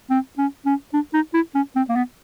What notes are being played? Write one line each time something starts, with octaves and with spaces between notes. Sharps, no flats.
C4
C#4
C#4
D4
D#4
E4
C#4
C4
A#3
B3